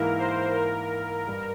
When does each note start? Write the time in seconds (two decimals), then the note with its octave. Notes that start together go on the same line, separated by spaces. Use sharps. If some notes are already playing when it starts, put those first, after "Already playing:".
Already playing: G#2 E3 A#3 E4 A#4
0.19 C5
0.56 A#4
1.27 G2 G3